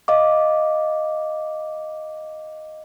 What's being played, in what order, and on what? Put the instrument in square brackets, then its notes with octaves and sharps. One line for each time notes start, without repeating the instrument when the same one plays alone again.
[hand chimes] D#5 F5 D6